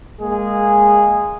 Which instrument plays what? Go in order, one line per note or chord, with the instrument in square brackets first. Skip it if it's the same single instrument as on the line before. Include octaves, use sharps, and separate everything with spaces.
[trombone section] G#3 A#3 G#4